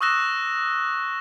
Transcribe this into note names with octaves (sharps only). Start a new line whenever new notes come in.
C#6 D#6 E6 F#6 A#6 E7